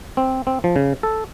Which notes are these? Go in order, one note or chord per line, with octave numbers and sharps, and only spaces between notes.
C4
C4
F3
C#3
A4